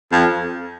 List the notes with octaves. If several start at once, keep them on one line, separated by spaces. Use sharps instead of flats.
F2